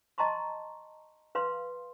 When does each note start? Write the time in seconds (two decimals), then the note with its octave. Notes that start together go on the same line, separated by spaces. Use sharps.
0.18 D#5 A5 A#5 C6 C#6
1.35 B4 F5 C6